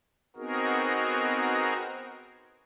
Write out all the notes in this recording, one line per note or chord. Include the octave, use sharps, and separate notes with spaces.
B3 C4 D#4 F#4 G#4 A#4